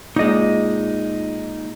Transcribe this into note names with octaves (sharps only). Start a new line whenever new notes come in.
A#2 G#3 D#4 D#5